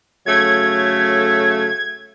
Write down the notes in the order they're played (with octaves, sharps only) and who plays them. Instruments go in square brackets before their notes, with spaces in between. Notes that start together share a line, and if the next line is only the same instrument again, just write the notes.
[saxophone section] C#3 F#3 A3 [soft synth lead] G#6